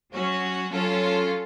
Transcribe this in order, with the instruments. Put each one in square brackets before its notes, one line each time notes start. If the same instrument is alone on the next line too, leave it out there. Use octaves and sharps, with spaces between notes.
[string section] F#3 C#4 F#4
F#3 C#4 F4 A4